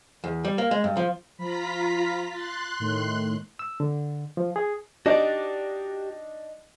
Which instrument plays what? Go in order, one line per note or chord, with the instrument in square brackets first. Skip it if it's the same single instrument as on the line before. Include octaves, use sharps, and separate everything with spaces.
[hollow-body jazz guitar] E2
G3
A#3
G#3
G2
F3
[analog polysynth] F3 B5 [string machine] F4 A#5 B6
[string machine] C6 F#6 [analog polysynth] A6
[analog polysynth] A2 D#3 A3
[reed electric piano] E6
D3
F3
G#4
[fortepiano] D4 D#4 D#5 [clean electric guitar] F#4 G4 D5